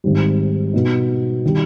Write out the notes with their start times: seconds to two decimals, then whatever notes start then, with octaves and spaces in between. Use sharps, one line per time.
0.04 G#1 G#2 G3
0.73 B2 B3 D#4
1.45 D#3 G3